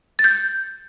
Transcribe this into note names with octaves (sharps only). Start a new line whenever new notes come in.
A6
G6